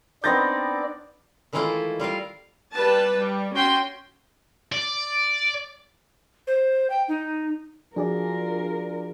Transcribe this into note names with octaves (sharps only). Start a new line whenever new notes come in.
B3 C4 D4 D#4 D5 G6 A6 A#6
D#3 E3 G#3 A3 E4 F4
G3 F4 A#4 F5
G3 B4 A5
G3
C#4 F#4 G5 C6
D5
C5
G5
D#4
F3 D4 F4 F#4 G#4 A#4 D5